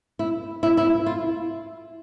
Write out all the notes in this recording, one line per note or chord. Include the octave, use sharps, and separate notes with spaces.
E4
E4
E4
F4